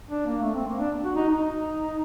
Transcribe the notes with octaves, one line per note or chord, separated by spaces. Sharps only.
D4
A#3
A3
C4
A#3
D4
F#4
D#4
D#4